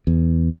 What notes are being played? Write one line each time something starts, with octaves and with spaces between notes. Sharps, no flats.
E2